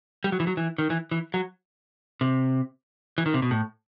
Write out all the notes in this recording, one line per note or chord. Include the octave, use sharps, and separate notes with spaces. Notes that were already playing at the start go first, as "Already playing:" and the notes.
G3
F#3
E3
F#3
E3
D#3
E3
E3
F#3
C3
E3
D#3
C3
B2
A2